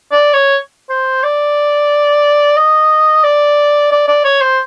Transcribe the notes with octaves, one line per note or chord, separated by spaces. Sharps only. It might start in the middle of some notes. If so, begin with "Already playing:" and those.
D5
C#5
C5
D5
D#5
D5
D5
D5
C#5
C5